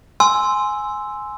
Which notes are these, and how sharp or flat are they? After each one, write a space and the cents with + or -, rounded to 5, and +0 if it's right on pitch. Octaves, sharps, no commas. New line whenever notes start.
G#5 +5 C6 +0 E6 +0